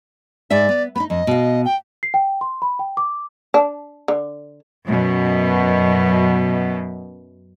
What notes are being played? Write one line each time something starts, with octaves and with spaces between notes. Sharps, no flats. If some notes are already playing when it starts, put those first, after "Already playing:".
G#2 G#4 D5 E5
B3
B3 D#4 B5
F2 D#5
B2 F5
G5
C7
G5
C6
B5
G5
D6
D4
D3
F#2 B2